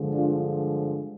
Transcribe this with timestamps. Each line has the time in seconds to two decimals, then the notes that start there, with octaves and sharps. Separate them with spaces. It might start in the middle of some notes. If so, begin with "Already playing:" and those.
Already playing: G2 D3 F3 G#3
0.14 D4 F4